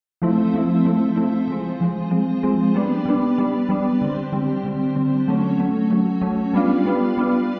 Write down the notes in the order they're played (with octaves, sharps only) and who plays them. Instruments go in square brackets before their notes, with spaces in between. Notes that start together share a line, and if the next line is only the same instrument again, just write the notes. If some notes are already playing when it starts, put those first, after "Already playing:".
[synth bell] F3 A3 C4 E4
F3 A3 C4 E4
F3 A3 C4 E4
F3 A3 C4 E4
F3 G#3 C4
F3 G#3 C4
F3 G#3 C4
F3 G#3 C4
G3 B3 D4
G3 B3 D4
G3 B3 D4
G3 B3 D4
D3 G3 C4
D3 G3 C4
D3 G3 C4
D3 G3 C4
F#3 A3 C#4
F#3 A3 C#4
F#3 A3 C#4
F#3 A3 C#4
G3 B3 D4 F4
G3 B3 D4 F4
G3 B3 D4 F4